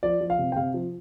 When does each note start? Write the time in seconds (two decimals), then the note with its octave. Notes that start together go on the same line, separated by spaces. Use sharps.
0.03 F3 D5
0.21 F3
0.30 F5
0.38 C3
0.52 G5
0.56 C3 F5
0.74 F3